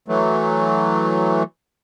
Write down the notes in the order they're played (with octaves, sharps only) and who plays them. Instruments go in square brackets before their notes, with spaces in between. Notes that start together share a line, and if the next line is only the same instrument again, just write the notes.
[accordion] E3 F#3 A3